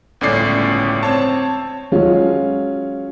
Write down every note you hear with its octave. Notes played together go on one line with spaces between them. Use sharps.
G1 C#2 A2 C#4 D5 C7
C4 C#5 A5
F#3 G#3 C#4 F4